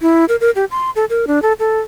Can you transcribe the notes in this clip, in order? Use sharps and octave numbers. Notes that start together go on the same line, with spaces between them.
E4
A#4
A#4
G4
C6
A4
A#4
D4
A4
A4